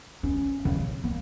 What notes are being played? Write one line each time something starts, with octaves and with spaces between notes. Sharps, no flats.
C#4
C#3
A#3